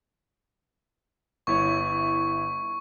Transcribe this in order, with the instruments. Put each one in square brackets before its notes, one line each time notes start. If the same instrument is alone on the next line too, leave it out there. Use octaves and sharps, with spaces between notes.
[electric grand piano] G1 E4 C#5 [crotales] C#6